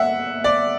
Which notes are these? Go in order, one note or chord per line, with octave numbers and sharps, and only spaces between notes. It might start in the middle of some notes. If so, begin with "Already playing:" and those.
Already playing: E5 F#5
D5